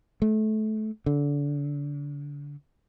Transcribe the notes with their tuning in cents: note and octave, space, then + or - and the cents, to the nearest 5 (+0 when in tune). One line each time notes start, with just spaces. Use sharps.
A3 -25
D3 -30